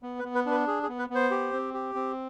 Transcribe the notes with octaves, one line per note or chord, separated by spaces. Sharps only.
B3
B4
B3
B4
D4
B4
G#4
G#4
B3
B4
B3
C5
G4
C4
G4
C4